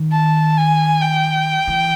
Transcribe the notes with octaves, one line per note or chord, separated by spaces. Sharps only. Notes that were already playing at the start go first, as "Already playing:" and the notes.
Already playing: D#3
A5
G#5
G5
E3